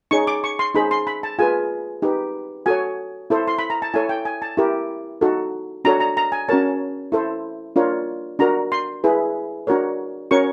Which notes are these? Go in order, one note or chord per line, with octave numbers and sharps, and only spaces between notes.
D#4 G#4 C#5 C#6
D6
C#6
C6
D#4 G#4 C5 B5
C6
B5
A5
F4 G#4 B4 G#5
D#4 G4 B4
F#4 A4 C#5 G#5
E4 A4 C5
C6
B5
A#5
A5
E4 A4 C#5 G#5
G5
G#5
A5
E4 G4 A#4
D#4 F#4 A4
D4 F#4 A4 C#5 A#5
A#5
A#5
G#5
C#4 F#4 A#4 C#5 A5
E4 A4 C5
D4 F4 A#4 C#5
D4 F#4 A#4 A#5
C6
E4 G#4 B4
D4 F#4 A#4 C#5
C#4 F#4 A#4 C#5 C#6